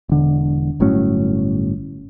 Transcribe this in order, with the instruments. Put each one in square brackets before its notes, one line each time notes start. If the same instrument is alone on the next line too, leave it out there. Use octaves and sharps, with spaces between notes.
[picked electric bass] E1 D3
G1 A2 F#3 C#4